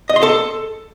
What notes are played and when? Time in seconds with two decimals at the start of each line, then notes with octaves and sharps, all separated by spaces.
0.09 D#5
0.16 C6
0.23 A4